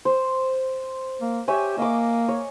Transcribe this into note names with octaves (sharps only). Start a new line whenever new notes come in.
C5
A#3
G4 C#5 E5 G#5
A#3 D#5 D6
C#5